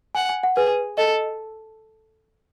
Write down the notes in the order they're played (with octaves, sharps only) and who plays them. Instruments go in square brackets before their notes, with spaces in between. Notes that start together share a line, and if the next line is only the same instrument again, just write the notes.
[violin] F#5 [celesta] G#5
[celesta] G#5
F#5
[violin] G#4 [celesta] B4
[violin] A4 [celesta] D#5